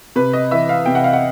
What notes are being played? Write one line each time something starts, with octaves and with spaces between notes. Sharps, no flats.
C3 B4
D#5
E3 E5
F5
C3 G5
F#5
F5
F#5